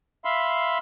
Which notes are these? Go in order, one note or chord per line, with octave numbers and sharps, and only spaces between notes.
E5 F5 B5 C6